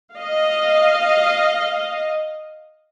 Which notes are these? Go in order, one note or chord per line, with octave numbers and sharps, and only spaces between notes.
D#5 F5